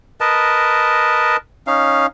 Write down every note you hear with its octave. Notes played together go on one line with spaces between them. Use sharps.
A#4 B4 D#5 A5
C#4 D#4 F5